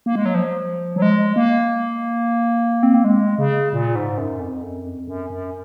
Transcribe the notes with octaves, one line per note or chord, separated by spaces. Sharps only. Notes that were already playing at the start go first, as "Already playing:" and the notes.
A#3
G#3
F#3
F3
F#3
G#3
A#3
C4
A#3
G#3
C#3
A#2
G#2
F#2
F2
F#2
F2
F#2
F#2